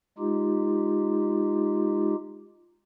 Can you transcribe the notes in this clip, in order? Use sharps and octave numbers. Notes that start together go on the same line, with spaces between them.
G#3 D#4 F4 G4